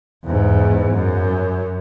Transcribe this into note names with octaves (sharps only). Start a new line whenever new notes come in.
E2 G#2
F#2